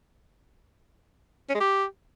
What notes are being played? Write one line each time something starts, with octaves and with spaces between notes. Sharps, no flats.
C#4
G#3
G4